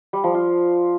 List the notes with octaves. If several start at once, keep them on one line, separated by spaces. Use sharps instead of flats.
G3
F3
F4